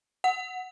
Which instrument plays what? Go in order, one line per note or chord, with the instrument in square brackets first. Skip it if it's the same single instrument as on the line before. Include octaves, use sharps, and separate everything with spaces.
[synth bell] F#5